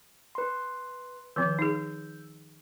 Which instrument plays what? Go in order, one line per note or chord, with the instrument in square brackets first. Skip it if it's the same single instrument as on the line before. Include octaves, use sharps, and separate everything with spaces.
[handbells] B4 C6
[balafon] D#3 F3 C4 [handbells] E6 G6
[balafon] D#4 G#4